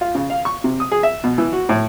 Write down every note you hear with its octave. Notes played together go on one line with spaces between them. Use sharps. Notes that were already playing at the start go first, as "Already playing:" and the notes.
F4
C#3
F5
C#6
C3
D#6
G#4
E5
B2
E3
F#4
A2